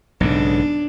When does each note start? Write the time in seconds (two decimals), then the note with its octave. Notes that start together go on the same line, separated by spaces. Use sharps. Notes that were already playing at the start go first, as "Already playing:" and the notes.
0.21 B1 G#2 C#3 D4